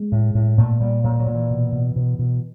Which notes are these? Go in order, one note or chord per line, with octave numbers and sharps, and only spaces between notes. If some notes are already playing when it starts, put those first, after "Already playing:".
Already playing: G#3
A2
A2
A#2 A3
A#2 G3
A#2 F#3
F#3
A#2
E3
B2
B2
B2
B2